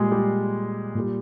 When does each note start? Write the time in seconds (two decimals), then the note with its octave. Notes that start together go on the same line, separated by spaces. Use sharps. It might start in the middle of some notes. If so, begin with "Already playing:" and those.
Already playing: A#2 G3 G#3 G#4
0.11 G3 G4
0.95 A#2 G3